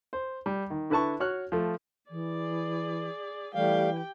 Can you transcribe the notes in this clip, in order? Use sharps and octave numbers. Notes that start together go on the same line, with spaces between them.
C5
G3
D#3
D3 E4 B4 A5 C#6
F#4 C#5 F6 F#6
F3 A3
E3 G#4 D5
E3 G3 A3 G4 F5 G5